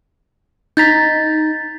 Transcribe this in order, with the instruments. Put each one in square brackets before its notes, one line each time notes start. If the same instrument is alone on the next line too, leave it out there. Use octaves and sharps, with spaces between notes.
[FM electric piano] D#4 A#5 [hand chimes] G6 A6 B6